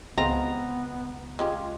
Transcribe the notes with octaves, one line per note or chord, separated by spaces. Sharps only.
C#2 G#3 B3 C4 F4 A#5
G#3 C#4 F4 G4